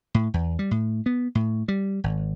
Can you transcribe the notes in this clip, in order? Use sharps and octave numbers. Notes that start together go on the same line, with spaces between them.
A2
E2
G3
A2
B3
A2
G3
G#1